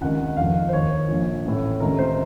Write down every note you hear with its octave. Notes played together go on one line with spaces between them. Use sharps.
C#2 C3 D#3 F#5
F1 F2 D#3 F5
C5
D#2 D#3 C#5
A#1 A#2
A1 A2
C#2 C3 D#3 A#4
C5